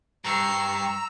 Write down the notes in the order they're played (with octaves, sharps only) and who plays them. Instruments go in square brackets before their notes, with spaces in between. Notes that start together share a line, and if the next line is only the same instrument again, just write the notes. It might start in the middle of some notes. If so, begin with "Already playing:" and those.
[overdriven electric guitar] G2 [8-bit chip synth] A#5 E6 [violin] C#6 C7